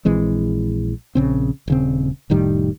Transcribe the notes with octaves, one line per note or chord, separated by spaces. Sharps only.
A#1 E3 G#3 C4
A#1 C#3 C4
D#1 C#3 C4
F1 A2 D#3 G3